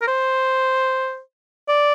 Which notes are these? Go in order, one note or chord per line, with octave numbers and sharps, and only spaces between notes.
A#4
C5
D5